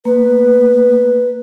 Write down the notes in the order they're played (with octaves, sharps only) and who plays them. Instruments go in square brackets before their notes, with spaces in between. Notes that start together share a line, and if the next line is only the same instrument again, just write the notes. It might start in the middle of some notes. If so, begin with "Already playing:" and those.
[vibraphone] A#3 [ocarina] B4